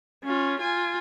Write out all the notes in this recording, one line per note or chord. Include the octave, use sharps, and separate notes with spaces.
C#4 F4
F4 G#5